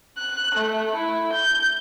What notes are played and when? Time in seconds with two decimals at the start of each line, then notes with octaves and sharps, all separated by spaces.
0.18 F#6
0.55 A3
0.96 E4
1.33 G6